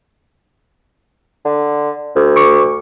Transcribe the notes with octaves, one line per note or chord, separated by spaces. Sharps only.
D3
D2
C#6 D6